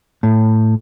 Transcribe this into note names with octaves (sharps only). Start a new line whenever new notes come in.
A2